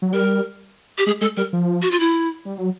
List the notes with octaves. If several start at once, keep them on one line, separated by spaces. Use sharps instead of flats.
F#3
G3 A#4
G4
G#3 G#4
G#3 A4
G3 A#4
F3
F#4
F4
E4
G3
F#3